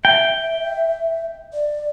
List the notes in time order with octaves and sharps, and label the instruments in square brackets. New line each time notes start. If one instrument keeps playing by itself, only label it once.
[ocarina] E5 [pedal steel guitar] G5
[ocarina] D5